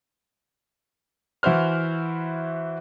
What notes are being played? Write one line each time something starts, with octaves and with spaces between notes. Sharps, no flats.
E3 E4 F#4 C5 F6